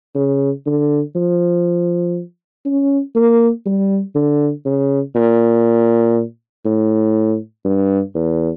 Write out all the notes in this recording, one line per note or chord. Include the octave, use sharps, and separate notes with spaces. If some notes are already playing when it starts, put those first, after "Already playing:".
C#3
D3
F3
C#4
A#3
G3
D3
C#3
A#2
A2
G2
E2